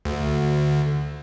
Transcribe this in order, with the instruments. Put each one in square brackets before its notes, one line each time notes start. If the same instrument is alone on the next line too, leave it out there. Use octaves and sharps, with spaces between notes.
[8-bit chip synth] D2